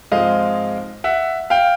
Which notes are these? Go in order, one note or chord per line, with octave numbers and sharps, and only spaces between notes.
G#2 F3 G#3 C4 D#5 F5
E5 F#5
F5 G5